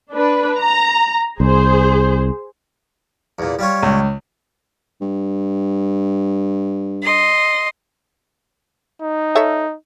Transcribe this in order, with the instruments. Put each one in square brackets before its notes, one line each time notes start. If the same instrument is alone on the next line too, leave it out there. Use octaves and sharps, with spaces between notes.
[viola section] D4 B4
A#5
[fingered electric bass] C2 [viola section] G#4 C5
[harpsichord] E2 A#2
G3 F4 C#5
[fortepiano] C#2
[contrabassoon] G2
[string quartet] D#5 C6
[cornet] D#4
[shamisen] A4 C#5 E5